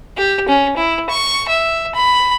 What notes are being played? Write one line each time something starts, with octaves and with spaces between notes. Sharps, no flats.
G4
C#4
E4
C#6
E5
B5